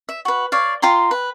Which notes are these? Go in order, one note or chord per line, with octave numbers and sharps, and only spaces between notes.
E5
F#4 B4
C#5 D5 F5
F4 G5 A#5 C6
B4